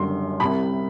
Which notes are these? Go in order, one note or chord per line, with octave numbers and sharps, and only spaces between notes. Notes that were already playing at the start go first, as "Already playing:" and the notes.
Already playing: F#1 F#2 D3 G3 C6
C2 C3 G3 B5